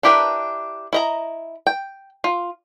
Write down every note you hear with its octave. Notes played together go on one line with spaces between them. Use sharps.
D4 E4 G4 A#4 B4
E4 D#5 A#5
G5
F4